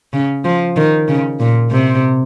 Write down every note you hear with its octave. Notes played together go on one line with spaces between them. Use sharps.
C#3
F3
D#3
C#3
A#2
C3